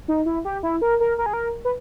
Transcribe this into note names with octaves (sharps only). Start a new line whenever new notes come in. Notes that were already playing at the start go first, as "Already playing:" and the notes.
D#4
E4
G4
E4
A#4
A#4
A#4
G#4
A#4
B4